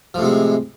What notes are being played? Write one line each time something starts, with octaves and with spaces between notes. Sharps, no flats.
A2 C3 F3 G#3